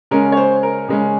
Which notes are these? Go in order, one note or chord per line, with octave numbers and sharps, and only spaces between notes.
C#3 G#3 C#4 A#4
C#5
C5
A#4
C#3 G#3 C#4